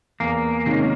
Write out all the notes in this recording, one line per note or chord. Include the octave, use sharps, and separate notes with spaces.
E2 A#3
C3 D#3 G#3 C#4